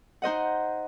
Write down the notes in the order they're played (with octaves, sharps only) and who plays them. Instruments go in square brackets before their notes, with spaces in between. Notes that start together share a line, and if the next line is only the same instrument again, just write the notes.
[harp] D#4 C5 D#5 F#5